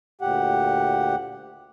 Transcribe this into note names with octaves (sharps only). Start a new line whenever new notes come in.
D2 A#2 G4 F#5